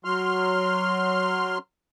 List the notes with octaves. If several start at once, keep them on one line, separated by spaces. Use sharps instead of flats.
F#3 C6 F6